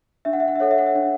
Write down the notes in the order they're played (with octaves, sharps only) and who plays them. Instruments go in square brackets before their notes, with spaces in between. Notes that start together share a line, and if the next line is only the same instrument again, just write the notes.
[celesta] D4 E5
F#5
E5
F#5
E5
A4 C#5 F#5
E5
F#5
E5
D4 F#5